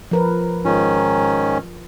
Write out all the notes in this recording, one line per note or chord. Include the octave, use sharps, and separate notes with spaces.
F3 A#4 B4
G#2 D#3 C#4 F4